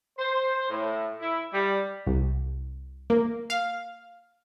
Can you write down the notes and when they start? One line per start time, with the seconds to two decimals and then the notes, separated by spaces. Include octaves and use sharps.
0.19 C5
0.70 A2
1.20 E4
1.53 G3
2.06 C2
3.10 A#3
3.50 F5